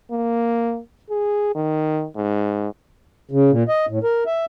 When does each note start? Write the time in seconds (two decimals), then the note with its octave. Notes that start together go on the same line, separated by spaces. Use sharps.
0.11 A#3
1.10 G#4
1.55 D#3
2.16 G#2
3.31 C#3
3.51 A#2
3.68 D#5
3.89 A2
4.04 A#4
4.27 E5